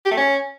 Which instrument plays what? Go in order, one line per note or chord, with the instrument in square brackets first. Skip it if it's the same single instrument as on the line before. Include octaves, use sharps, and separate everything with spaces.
[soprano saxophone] G4
A3
C#4